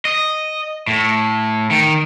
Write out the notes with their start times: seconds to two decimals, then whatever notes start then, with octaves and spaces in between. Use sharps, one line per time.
0.05 D#5
0.87 A2
1.71 D#3